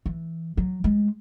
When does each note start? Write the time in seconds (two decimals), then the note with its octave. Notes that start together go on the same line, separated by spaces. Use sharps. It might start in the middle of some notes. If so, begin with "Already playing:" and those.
0.06 E3
0.57 F#3
0.84 G#3